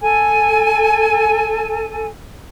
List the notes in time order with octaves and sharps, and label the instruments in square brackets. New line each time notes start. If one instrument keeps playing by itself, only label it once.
[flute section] A4 G#5